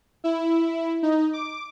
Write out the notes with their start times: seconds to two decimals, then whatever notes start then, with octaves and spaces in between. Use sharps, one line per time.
0.24 E4
1.03 D#4
1.33 D6